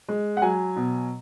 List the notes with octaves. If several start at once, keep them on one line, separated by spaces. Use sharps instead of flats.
G#3
F#5
F#3 G#5
B2